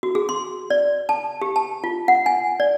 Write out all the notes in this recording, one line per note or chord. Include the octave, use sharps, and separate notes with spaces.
F#4
G#4
C6
D5
A5
G4
A5
F4
F#5
G#5
D5